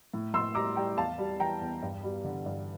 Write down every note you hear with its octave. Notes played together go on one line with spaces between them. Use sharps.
A2
A2 C6 E6
G3 A#5 D6
G3 G5 A#5
E2 F5 A5
G3
E3 G5 A#5
E2
G2
G3
D3
G2